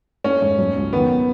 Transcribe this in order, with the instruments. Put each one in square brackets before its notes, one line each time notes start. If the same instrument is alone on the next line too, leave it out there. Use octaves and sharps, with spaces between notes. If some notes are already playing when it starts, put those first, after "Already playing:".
[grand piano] A3 [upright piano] C#4
[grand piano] G#2
F#3
C#2
[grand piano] D#3 [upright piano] B3